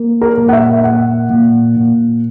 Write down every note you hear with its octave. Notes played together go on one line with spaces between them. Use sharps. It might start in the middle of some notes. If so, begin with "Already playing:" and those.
Already playing: A#3
A#4
A#2
F#5
E5
A#3 F#5
A#2
A#2